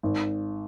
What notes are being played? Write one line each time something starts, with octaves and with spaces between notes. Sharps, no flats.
G#1